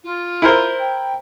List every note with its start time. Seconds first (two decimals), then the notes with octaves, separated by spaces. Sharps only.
0.03 F4
0.42 E4 A#4 C5
0.78 G5